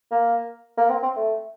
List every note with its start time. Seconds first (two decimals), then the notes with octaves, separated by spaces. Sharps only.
0.11 A#3
0.77 A#3
0.89 C4
1.03 C4
1.16 A3